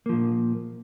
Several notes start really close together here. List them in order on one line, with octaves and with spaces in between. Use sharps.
A#3 F3 A#2